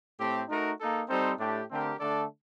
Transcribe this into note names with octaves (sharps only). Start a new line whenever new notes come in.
A2 A3 C4 G4
A3 D#4 F#4 A#4
A#3 D#4 A4
G3 C4 D#4 A4 C5
A2 A3 D4 G4
D3 A3 C4 G4 A#4
D3 A3 D4 A4 D5